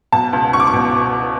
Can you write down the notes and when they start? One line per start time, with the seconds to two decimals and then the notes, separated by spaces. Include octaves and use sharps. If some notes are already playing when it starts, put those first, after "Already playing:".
0.12 B2 A5
0.33 C#2
0.53 C#2 C#6
0.60 D6
0.67 C#6
0.74 B2